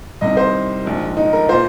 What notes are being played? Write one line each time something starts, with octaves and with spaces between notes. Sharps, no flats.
C2 C3 D#3 D#5
C5
A#1 G#2 D#3
D#4
A#4
A#2 C5